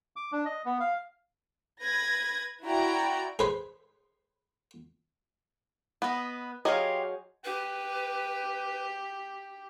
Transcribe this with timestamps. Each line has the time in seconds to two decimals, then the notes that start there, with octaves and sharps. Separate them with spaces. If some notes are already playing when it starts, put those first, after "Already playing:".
0.16 D6
0.32 D4
0.45 D#5
0.65 B3
0.80 F5
1.82 B4 G#6 A#6
2.65 E4 F#4 D5 G5 A#5
3.39 G#4 B4 C5
6.02 B3 B4 D#5
6.65 F#3 G4 G#4 C5 D#5 F5
7.45 G4 B4